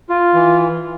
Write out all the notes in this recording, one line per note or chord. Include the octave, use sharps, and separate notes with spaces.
F4
E3